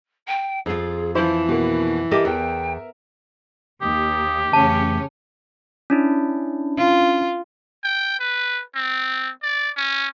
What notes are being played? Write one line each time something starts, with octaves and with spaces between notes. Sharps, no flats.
G5
F2 F4 G#4
E3 F3 E4 C5
B2 A#3
G4 A4 A#4 D#5 E5 D6
E2 G5
D#2 G4 D#6
F2 C#3 E3 A3 C#4 A5
C#4 D4 E4
F4
G5
B4
C4
D5
C#4